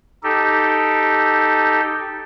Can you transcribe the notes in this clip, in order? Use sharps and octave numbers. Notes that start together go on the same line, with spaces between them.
D#4 G4 A4